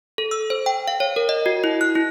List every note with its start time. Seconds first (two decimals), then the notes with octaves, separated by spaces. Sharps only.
0.18 A4
0.31 E6
0.50 C5
0.66 G5
0.88 F5
1.00 C#5
1.16 A#4
1.29 D#5
1.46 F#4
1.64 E4
1.81 F#6
1.95 E4